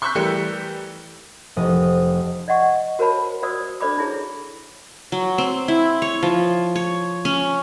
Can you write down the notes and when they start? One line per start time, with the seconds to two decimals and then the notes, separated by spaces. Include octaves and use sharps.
0.02 C6 C#6 E6 F#6 G6 B6
0.15 E3 G3 A3 G4 A#4 C#7
1.57 F1 D#5
2.48 D5 D#5 F#5 C#6
2.99 F#4 A#4 C5 C#5 A5 B5
3.43 F#4 C5 D5 D#6 E6
3.81 D4 A4 C5 D5 B5 D6
3.98 D#4 E4 G#4 C#5
5.12 F#3
5.38 C4
5.68 E4
6.02 C#5
6.23 F3
6.76 C#5
7.25 C#4